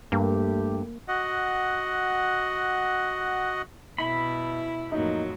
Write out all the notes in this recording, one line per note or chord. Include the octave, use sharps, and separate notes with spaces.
G2 A3 A#3 G4
F#4 D#5 F#5
B2 E4 B5
F2 A2 F#3 A#3 D#4